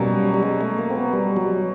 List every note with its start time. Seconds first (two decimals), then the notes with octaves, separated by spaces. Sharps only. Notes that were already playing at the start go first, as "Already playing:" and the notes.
Already playing: B2 F#3 G3 A#3 C#4
0.34 G3
0.43 G#3
0.61 A3
0.78 A#3
0.90 C4
0.96 B3
1.13 G3
1.37 F#3